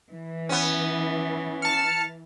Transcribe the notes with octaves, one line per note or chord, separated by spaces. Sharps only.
E3
B3 C#4
A5 F6 C#7